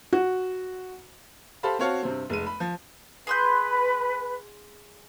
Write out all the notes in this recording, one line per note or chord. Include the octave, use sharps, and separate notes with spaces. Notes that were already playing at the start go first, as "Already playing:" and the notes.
F#4
G4 A4 C5 F5 A5 B5
C4 F#4 C#5 F5 A5
G2 C3 C4
F1 G#3 D#7
B5
F3
G#4 B4 C6 G6